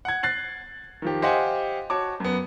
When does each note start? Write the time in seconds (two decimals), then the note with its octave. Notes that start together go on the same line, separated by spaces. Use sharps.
0.05 F#5 G#6
0.23 F#6 A6 C7 F#7
1.02 D#3 F3 G4
1.22 G4 C5 D#5 F5 F#5 G#5
1.90 F#4 C#5 A5 D6
2.20 F#2 B3